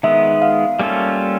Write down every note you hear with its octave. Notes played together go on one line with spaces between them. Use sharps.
D#3 G#3 B3 E5
F5
G3 A#3 C#4 F4 A4